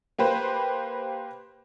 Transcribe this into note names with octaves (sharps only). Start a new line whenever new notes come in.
A#3 G4 B4 C5